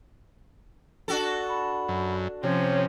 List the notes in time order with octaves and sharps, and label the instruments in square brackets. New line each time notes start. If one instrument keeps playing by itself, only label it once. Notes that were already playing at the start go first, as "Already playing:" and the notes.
[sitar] D4 F#4 A4
[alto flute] B5
[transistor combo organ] F#2
[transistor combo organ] C3 [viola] F3 C#4 [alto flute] C#5